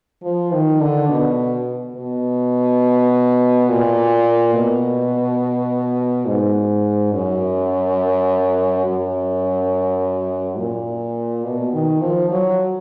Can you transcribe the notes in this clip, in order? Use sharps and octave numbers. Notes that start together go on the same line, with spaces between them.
F3
D#3
D3
B2
B2
A#2
B2
G#2
F#2
F#2
A#2
B2
D#3
F3
F#3